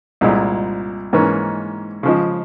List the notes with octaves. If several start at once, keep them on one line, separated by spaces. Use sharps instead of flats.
C2 A#2 G#3 E4
G#2 E3 A#3 C#4
C#3 F3 G#3